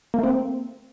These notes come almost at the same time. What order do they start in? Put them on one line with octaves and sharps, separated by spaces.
A#3 A3 C4